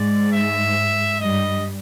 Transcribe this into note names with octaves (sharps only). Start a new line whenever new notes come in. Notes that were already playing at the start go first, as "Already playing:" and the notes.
Already playing: G#2 G#3 D5
E5
G2 G3 D#5